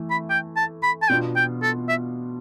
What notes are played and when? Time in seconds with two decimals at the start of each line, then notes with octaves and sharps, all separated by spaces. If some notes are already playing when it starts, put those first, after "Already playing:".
Already playing: E3 A3 E4
0.11 B5
0.30 G5
0.56 A5
0.83 B5
1.02 A5
1.09 B2 B3 D4 F4 G5
1.36 G5
1.62 A4
1.89 E5